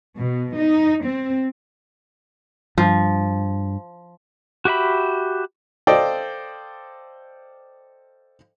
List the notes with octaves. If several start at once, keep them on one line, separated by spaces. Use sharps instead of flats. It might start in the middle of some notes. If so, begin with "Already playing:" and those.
B2
D#4
C4
G2 F3
F#4 G4 E5 B5
A4 C5 D5 D#5 F5 G5